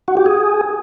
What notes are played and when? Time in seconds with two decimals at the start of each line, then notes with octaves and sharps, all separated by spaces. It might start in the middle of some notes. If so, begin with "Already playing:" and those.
0.08 F#4
0.17 G4
0.26 G#4